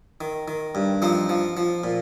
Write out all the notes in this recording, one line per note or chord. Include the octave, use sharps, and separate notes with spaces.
D#3
D#3
G2
F3 C4 D#4
F3
F3
A#2